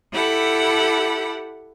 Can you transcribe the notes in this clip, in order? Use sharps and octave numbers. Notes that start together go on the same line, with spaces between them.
E4 G4 A4 F#5 B5